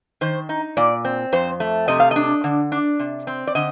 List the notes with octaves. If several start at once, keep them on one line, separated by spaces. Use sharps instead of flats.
D#3 C5
D#4
A#2 D5
C4
F2 C5
A3
C3 D#5
F5
D4 D#5
D3
D4
C3
C4
D5
D3 D#5